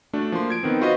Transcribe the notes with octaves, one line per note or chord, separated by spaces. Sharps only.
A3 D4 F#4
F3 A#3 C6
G#6 D7
D#3 B3 C4
F4 F#4 B4 C5 D#5